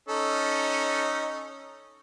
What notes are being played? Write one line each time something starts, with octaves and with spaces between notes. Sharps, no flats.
C#4 D#4 A4